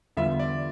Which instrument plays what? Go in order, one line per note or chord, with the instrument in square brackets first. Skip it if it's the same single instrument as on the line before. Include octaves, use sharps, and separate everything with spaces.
[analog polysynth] E2 D3 G3 B3 F4 [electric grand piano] E5
[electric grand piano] D5